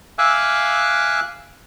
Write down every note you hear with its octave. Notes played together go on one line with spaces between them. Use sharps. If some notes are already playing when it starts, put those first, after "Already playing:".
E5 F5 G#5 D6 E6 F#6